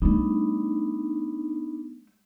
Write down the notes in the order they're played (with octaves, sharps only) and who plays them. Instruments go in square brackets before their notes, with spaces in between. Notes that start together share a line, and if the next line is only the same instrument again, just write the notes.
[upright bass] G3 A3 [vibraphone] B3 D4 D#4